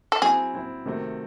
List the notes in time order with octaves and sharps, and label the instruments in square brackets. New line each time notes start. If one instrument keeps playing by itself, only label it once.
[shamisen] A4
[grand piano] F#3 C4 E4 [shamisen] G#4
[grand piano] F#3 C4 E4
C3 D#3 F#3 A3 C4